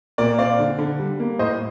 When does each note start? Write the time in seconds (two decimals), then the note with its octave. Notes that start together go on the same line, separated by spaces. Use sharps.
0.18 A#2 A#4 D5
0.39 C4 D5 F5
0.59 D3
0.78 D3
0.99 G3
1.19 A#3
1.39 A2 C5 D#5